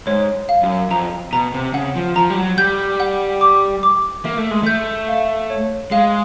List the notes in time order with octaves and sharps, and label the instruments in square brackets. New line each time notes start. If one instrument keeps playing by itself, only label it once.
[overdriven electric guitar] G#2 [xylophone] C#5
[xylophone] F5
[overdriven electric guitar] F#2
[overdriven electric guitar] F2 [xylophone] A#5
[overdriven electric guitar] B2 [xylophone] A#5
[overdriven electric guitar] C3
[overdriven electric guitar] C#3 [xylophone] F#5
[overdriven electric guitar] F3
[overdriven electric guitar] F3 [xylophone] A#5
[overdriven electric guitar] G3
F#3
[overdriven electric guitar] G3 [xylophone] G6
[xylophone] F#5
D6
D6
[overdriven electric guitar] A#3 [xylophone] E5
[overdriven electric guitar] A3
G#3
[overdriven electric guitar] A3 [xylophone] G6
[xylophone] F5
C#5
[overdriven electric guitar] G#3 [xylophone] F5